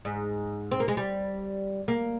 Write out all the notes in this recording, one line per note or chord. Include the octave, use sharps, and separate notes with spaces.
G#2
C4
A#3
G#3
G3
A#3